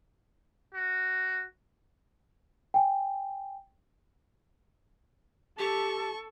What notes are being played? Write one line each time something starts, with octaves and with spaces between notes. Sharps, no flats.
F#4
G5 G#5
G4 A4 A5 C#6